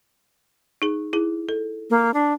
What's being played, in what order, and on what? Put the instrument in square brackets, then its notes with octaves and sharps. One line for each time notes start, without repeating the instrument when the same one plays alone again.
[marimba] D#4 G#4
E4 G#4
A4
[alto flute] A#3
D4